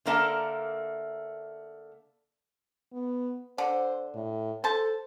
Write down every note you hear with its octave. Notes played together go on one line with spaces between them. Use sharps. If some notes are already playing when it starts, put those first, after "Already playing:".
D3 A3 A#3 A#4 F#5 A5
B3
D3 C5
A2
A4 C5 A5